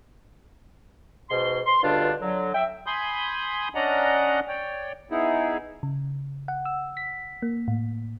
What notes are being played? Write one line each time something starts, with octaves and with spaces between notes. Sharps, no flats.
G#2 B2 C6
C6
C#2 G2 B2 D3 D4 F4
D3 F#3
E5 G5
G#5 B5 C6 D#6 G6
C#4 D4 D5 D#5 F#5 A#5
C#5 D5 G5
B3 D#4 E4 G#4
C#3
F#5
E6
B6
A#3
A2